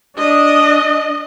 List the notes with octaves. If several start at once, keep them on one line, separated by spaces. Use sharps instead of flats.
D4 D#5